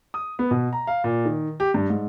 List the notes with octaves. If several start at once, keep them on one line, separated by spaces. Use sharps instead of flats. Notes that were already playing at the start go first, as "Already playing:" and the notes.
D#6
B3
B2
A#5
F5
A#2
D#3
G4
G2
G#2